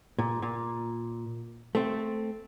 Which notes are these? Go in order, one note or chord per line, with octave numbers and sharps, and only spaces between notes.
A#2
A#2
A3 C4